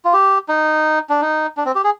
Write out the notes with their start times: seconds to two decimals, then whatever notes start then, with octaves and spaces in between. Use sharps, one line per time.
0.05 F4
0.13 G4
0.49 D#4
1.09 D4
1.21 D#4
1.57 D4
1.65 C4
1.75 G4
1.84 G#4